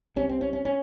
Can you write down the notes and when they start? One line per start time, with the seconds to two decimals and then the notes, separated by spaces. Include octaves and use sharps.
0.16 C2 C3 C#4
0.29 C4
0.41 C#4
0.53 C#4
0.65 C#4